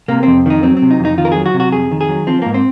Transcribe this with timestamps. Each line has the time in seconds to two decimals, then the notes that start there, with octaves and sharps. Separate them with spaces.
0.08 C3 A#3
0.23 F2 C4
0.46 D#3 D#4
0.63 F#3 C4
0.77 C4
0.82 C3
0.91 D#4
0.99 F2
1.05 D#4
1.18 D#3 F4
1.25 A#4
1.32 F#3 G#4
1.46 F#4
1.54 C3
1.60 F#4
1.72 F2 G#4
1.91 D#3
2.01 G#4
2.09 F#3
2.27 F3 C4
2.42 G#2 A#3
2.54 C4